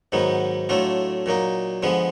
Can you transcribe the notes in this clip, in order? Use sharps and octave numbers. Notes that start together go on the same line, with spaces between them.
G#2 D#3 F#3 B3
A2 F#3 A3 D4 F4
A#2 F#3 A#3 D#4
D3 F3 G#3 B3